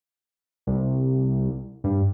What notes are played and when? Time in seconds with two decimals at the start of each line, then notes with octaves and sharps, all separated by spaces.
0.67 C2
1.84 G2